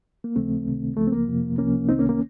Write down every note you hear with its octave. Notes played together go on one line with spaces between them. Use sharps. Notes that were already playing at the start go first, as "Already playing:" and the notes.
A#3
D#2 C#3 F3 A3 C4
C#2 C3 D#3
C#2 C#3 F3 A3
C4
A#3
F2 C3 F3
C2 C3 F3 A#3 C#4
C2 C3 D#3 C4 D#4
A#3 C#4
A#3 C#4